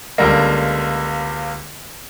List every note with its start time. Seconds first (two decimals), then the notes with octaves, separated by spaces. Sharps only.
0.18 C#2 D3 G3 A#3